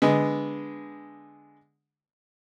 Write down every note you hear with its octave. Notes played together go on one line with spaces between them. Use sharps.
D3 G#3 B3